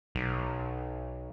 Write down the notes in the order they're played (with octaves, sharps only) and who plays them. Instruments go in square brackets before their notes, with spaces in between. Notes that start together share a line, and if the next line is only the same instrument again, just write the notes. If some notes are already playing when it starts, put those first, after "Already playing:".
[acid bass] B1